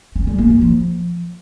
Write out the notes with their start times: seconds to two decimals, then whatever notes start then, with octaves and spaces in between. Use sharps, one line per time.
0.16 C#4
0.27 G3
0.38 A#3
0.50 E4
0.61 F3